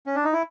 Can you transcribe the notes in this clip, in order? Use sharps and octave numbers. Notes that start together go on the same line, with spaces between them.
C#4
D4
D#4
E4